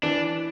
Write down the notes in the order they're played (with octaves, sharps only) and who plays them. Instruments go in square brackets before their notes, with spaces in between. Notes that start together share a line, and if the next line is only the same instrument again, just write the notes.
[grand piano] E3 [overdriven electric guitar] D4